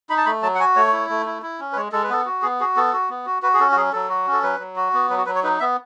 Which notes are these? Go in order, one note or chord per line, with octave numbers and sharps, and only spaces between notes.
D#4 B5
A5
A3 B5
F#3 A5
F#5
F#4 G#5
A3 C#5
E4
A3
E4
E4
C#4
B4
G#3 C#5
G#3 A4
B4
B3 A4
F#4
B3 G#4
F#4 G#4
B3 A4
F#4
B3
F#4
F#4 B4
G#4
C#4 A4
F#4
F#3 G#4
F#3 A4
F#4
C#4
A4
F#3 B4
F#3
F#4
B3
F#3 B4
F#4
F#3 B4
C#5
D#4 B4
B3 E5